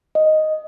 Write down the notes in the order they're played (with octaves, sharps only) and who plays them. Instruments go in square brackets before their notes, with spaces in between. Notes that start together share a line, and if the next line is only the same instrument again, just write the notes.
[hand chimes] D#5